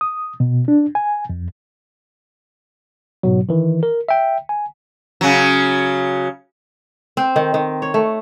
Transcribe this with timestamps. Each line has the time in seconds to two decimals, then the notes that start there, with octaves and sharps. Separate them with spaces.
0.01 D#6
0.40 B2
0.68 D4
0.95 G#5
1.30 F2
3.23 G#2 B2 F#3
3.49 D#3 E3
3.83 A#4
4.09 E5 G5
4.49 G#5
5.21 C#3 F#3
7.17 C4
7.36 D#3
7.54 D#3
7.82 C#5
7.94 A3